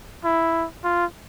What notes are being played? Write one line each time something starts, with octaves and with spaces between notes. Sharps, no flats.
E4
F4